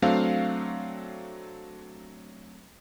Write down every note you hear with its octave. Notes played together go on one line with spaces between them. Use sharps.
F#3 A3 C4 D4 F5